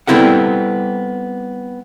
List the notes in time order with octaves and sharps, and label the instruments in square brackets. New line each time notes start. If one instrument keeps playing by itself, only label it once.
[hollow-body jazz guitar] G3 B3 C4 E4 A4 F#5